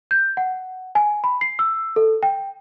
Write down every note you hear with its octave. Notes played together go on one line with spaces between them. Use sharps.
G6
F#5
G#5
B5
C7
E6
A4
G5